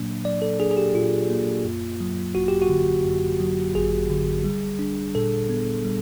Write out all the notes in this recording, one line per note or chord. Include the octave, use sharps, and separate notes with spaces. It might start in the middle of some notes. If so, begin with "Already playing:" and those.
Already playing: A#2 F#3 A#3 D4
F#3 D5
A4
D4 G#4
G#4
G4
A#2 F4
A#3
F#2
F#3
G#1 F#4
G4
F#4
D3
F#2
F#3
G#1 G#4
D3
G3
D4
A#2 A4
B3
G3